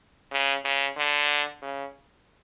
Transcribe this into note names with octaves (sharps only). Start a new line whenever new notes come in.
C#3
C#3
D3
C#3